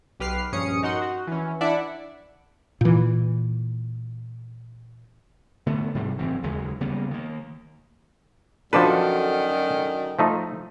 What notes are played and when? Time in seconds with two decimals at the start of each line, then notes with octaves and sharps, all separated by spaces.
0.20 B1 G4 B4 F6 C7
0.52 A#1 G2 C#4 D#6 C#7
0.83 D#4 F#4 A#4 F#5 C6
1.02 F#4
1.27 E3 C#4
1.61 D4 E4 D5 E5 F#5 B5
2.81 A#2 E3
5.67 D3 A3 B3
5.95 G#2 C3 G3
6.18 F#1 G#2 E3 C4
6.43 F#1 D#2 C#3 G#3
6.80 C#3 G3 A#3 B3
7.11 D#3 A#3
8.73 F#2 D3 D#3 F3 D4 F#4 A4 B4
10.19 F3 A3 D#4